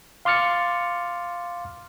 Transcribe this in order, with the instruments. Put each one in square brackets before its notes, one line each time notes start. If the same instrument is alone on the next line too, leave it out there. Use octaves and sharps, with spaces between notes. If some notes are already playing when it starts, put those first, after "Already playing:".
[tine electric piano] F5 C6 D6 F6 A6 C#7